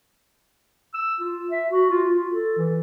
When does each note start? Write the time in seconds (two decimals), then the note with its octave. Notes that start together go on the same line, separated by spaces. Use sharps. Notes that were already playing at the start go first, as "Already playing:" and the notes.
0.94 E6
1.20 F4
1.51 E5
1.70 F#4
1.90 F4
2.07 F4
2.31 A4
2.57 E3